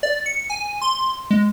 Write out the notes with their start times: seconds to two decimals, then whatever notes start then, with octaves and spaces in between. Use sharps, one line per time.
0.03 D5
0.26 C#7
0.50 G#5
0.82 C6
1.31 G#3